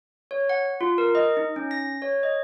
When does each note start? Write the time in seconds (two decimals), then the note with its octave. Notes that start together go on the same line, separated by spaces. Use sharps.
0.31 C#5
0.49 F#5
0.81 F4
0.98 A#4
1.15 D#5
1.37 D#4
1.56 C#4
1.71 A#6
2.02 C#5
2.23 D#5